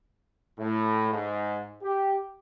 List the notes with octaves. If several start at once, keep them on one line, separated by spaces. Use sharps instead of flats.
A2
G#2
G4